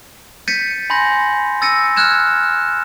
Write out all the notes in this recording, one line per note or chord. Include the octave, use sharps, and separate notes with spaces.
G6 A6 B6 C#7 D#7
G#5 B5 C6 G6 A#6
E6 A6 A#6 C#7 D#7
F6 F#6 G#6 E7